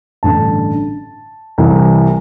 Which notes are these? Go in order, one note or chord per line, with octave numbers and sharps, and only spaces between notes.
A1 G2 D3 A5
C2 C3 E3